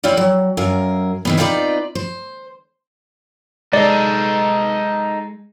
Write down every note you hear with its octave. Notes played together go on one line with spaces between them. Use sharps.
C4 C#4 E4 F4 D5
F#3
F#2 A#4 F5 G#5
D#3 E3 B3
C4 D#4 F4 G#4 B4 D5
C5
G#3 D#4 A4 D5 D#5